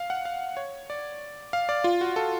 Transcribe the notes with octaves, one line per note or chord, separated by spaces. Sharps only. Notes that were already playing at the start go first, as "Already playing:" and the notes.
Already playing: F5
F#5
F5
C#5
D5
F5
D5
F4
F#4
A4